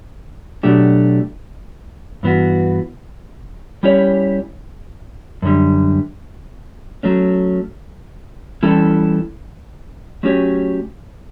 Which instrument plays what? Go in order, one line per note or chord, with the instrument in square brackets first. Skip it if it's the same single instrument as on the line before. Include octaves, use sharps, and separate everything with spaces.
[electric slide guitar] B2 F#3 A3 D4 G4
G2 E3 B3 F#4
G3 C#4 E4 G4 C#5
F#2 D3 G3
F#3 A3 C#4
E3 G3 C#4 E4 A4
F#3 A3 C#4 G4 C#5